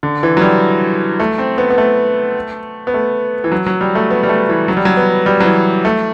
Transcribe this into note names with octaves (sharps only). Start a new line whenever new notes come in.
D3
E3
F#3
G3
A3
C4
B3
B3
A3
B3
A3
E3
F#3
F#3
G3
A3
B3
G3
A3
E3
F#3
G3
F#3
B3
G3
F#3
E3
A3